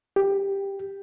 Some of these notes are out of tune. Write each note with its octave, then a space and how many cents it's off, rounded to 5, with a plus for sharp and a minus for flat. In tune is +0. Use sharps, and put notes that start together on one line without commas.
G4 +10